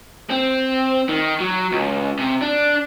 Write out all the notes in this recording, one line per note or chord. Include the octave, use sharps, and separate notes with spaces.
C4
D#3
F#3
C#2
C3
D4